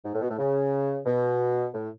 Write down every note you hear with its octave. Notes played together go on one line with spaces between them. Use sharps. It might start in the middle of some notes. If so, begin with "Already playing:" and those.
G#2
A2
B2
A2
C#3
B2
A2